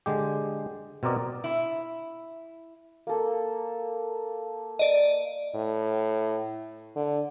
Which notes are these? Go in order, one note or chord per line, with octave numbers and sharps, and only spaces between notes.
D3 G#3 G4
B2 C4 A#4 D5 D#5
E4
A#3 A4
D5 D#5
A2
D3